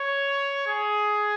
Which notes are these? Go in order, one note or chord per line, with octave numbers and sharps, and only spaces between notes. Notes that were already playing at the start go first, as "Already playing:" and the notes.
Already playing: C#5
G#4